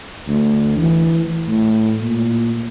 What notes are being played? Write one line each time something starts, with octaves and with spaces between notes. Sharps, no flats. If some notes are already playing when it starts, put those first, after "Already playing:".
D2
E3
A2
A#2